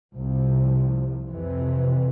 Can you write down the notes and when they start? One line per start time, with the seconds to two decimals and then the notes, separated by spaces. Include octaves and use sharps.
0.13 C2 C3 F3
1.29 F2 C3 E3